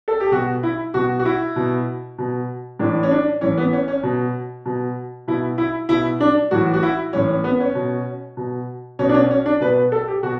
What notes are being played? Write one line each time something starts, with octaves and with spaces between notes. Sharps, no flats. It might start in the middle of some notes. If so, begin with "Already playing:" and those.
A4
G4
B2 F#4
E4
B2 F#4
F#4
E4
B2
B2
A2 E3 D4
C#4
D4
A2 E3 C#4
B3
C#4
C#4
B2
B2
B2 E4
E4
B2 E4
D4
A2 E3 F#4
F#4
E4
A2 E3 C#4
C#4
B3
C#4
B2
B2
B2 C#4
D4
C#4
C#4
D4
B2 B4
A4
G4
B2 F#4